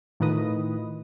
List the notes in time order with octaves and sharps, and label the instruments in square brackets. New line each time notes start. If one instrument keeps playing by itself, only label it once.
[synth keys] A2 D#3 F4 B4 D#5 D#6